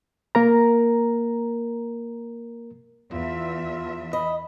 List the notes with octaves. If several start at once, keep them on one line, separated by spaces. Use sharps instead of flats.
A#3 A#4 A#5
E2 F4 E5
D#5 B5